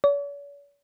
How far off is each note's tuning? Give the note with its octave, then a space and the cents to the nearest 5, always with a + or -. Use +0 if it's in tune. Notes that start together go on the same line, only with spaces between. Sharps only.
C#5 +45